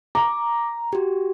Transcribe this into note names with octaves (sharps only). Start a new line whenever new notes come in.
A#5 D6
F#4 G4